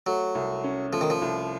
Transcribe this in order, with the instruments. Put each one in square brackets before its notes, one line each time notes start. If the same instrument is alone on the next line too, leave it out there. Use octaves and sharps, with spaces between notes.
[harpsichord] F#3 [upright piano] A3
[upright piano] C2
C#4
[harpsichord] F3 [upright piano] A3
[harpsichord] D#3
F3
[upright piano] C2